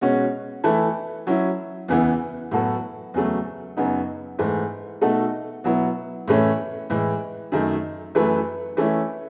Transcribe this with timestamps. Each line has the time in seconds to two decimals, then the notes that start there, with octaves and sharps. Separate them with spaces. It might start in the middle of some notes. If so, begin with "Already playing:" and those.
0.01 B2 G#3 C#4 F#4
0.64 E3 A3 E4 A4
1.27 F#3 C#4 E4
1.88 E2 C#3 E3 B3 E4
2.51 A2 F#3 B3 F#4 A4
3.14 E2 C#3 F#3 A3
3.77 F#2 C#3 F#3 B3 D#4
4.39 G#2 E3 A3
5.02 B2 A3 D#4 F#4 A4
5.64 B2 F#3 B3 E4
6.28 A2 E3 A3 C#4
6.90 A2 E3 G#3
7.52 F#2 D#3 A3
8.15 F#2 E3 A3 E4 B4
8.77 E3 A3 C#4 E4